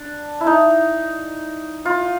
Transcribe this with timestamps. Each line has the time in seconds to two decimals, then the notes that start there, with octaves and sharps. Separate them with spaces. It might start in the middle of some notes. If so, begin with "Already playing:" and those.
Already playing: D4
0.41 E4
0.47 D#4
1.85 F4